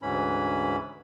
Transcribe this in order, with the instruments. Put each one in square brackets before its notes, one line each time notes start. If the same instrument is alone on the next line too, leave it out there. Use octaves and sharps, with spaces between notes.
[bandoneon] D2 G#2 E3 C#4 B5